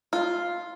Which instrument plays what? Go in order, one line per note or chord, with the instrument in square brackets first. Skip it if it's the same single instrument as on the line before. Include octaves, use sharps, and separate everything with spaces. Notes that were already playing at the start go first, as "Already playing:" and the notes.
[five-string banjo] F4